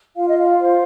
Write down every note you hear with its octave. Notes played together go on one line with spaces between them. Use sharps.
F4 F5
D#5
F5
C5